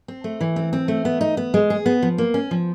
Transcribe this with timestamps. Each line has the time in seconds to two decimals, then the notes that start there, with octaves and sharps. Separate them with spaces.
0.08 C4
0.24 A3
0.41 E3
0.56 C4
0.73 C4
0.88 A3
1.05 B3
1.21 D#4
1.37 B3
1.54 G#3
1.70 G#4
1.86 B3
2.02 F3
2.18 A#3
2.34 C#4
2.51 F3